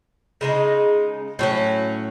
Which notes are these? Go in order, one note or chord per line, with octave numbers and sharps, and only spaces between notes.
C#3 G#3 D#4
A2 F#3 C#4